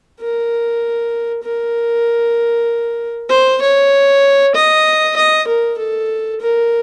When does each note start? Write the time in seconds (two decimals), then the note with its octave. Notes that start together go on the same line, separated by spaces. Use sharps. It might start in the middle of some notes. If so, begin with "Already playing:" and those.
0.20 A#4
1.43 A#4
3.29 C5
3.62 C#5
4.55 D#5
5.16 D#5
5.47 A#4
5.78 A4
6.41 A#4